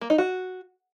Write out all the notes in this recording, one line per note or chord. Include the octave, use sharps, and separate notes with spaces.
A#3
D#4
F#4